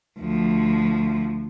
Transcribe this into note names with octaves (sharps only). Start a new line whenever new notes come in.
D2 F3